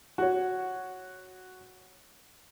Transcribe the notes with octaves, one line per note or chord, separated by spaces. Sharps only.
F#4 C#5